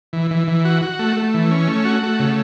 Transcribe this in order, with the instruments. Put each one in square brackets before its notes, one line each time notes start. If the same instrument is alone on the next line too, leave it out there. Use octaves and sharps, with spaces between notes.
[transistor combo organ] E3
E3
E3
F#4
F#4
A3
A3
E3
C#4
A3
F#4
A3
C#3